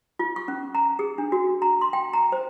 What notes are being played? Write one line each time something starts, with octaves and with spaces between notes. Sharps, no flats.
F4
C#6
C#4
A#5
G#4
D4
F#4
A#5
C6
G5
A#5
C5